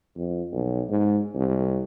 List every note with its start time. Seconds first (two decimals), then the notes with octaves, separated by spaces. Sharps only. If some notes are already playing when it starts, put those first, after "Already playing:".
0.17 F2
0.52 B1
0.89 G#2
1.35 C2